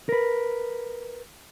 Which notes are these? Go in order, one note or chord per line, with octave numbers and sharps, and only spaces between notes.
A#4 B4